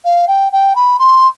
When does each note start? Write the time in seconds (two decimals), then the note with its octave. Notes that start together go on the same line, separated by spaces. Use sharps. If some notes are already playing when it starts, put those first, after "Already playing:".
0.04 F5
0.28 G5
0.52 G5
0.75 B5
0.99 C6